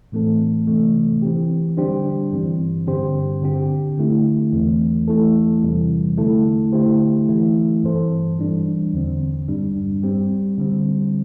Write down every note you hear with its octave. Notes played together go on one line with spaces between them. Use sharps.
A2 E3 A3 C4 A4
C3 E3 A3
E3 C4 G4
D3 G3 D4 G4 C5
G2 E3 C4
G2 D3 C4 G4 C5
D3 C4 G4
D3 A3 E4
E2 E3 A3 C4
E3 A3 E4 A4
E2 C3 E3 G3 C4
D3 A3 E4 A4
D3 A3 E4 G4 C5
E3 A3 E4
G2 E3 C4 A4 C5
E3 G3 D4
E2 D3 C4
G2 G3 D4
G3 C4 G4
D3 G3 C4